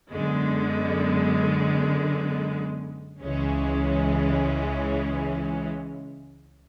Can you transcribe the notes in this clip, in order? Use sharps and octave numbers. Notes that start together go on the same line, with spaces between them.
F#2 D3 G#3 B3
C#2 C#3 E3 G#3 C#4